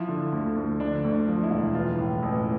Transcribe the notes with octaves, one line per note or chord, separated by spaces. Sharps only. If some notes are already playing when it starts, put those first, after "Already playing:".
Already playing: F3 E4
D3
D2
D2
D3 D4
D2
D4
F3
E4
E1
E3 F4
A2
A1